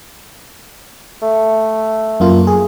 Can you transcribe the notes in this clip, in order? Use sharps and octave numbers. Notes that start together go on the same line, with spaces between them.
A3
F#2 A#3 F4
G#4